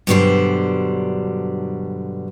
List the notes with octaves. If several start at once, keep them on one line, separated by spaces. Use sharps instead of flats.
G2 B2 D3 F#3 G3 C5